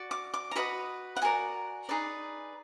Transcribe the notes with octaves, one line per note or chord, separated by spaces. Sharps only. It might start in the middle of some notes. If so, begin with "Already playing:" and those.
Already playing: F#4 D5
D6
D6
A#5
F#4 B4 D#5 B5
F#5
F#4 A#4 D5 G#5
D#4 G#4 B4 D5